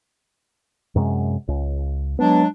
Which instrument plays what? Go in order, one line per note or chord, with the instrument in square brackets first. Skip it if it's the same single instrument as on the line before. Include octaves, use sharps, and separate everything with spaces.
[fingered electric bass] F#2 C3 G#3
C#2
[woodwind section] F#3 G#3 D4 [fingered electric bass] B3